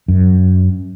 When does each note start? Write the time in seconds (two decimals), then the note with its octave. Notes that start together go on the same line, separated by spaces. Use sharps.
0.08 F#2